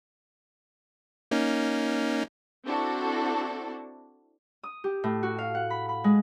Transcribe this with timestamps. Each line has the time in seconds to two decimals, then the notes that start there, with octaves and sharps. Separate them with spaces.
1.31 A#3 C#4 D#4
2.64 C4 D4 E4 F#4 A4
4.63 D#6
4.84 G4
5.04 A2
5.23 F#4
5.38 F5
5.55 F#5
5.70 B5
5.89 B5
6.04 G#3